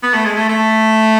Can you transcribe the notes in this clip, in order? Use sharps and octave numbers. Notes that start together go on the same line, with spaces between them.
B3
A3
G#3
A3
A3